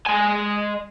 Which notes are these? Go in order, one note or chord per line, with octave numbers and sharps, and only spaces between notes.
G#3 G#5